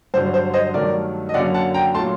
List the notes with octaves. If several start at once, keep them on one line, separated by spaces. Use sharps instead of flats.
G2 D3 F#3 C5
C5
C5 D#5
G2 D#3 F#3 A3 A#4 D5
D#5
F#2 D3 F#3 A#3 D5 F#5
F#5 A5
G5 A#5
A#2 F#3 A3 A5 C6